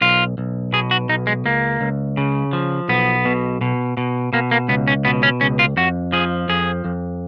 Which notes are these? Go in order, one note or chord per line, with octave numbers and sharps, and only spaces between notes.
B1 F4
B1
B2 G#4
F#4
B1 D#4
G#3
C#2 A#3
C#2
C#3
F3
B1 B3
B2
B2
B2
B2 A#3
A#3
C#2 B3
C#4
B2 B3
C#4
C#2 C#4
F4
F2 F#4
F3 G#4
F2 G#4
F2